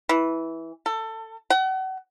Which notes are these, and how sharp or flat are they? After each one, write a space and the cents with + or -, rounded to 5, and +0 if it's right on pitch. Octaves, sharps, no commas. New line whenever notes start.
E3 -10
A4 +20
F#5 +35